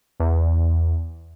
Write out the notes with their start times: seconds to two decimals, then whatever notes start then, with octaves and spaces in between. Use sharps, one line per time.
0.20 E2